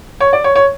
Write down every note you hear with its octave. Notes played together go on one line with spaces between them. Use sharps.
C#5
D5
C#5
C#5